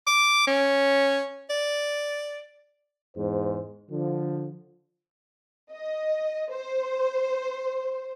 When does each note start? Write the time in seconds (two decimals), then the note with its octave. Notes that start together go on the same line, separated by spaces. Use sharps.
0.07 D6
0.47 C#4
1.50 D5
3.16 E2 G#2 C5
3.91 D3 F3
5.73 D#5
6.51 C5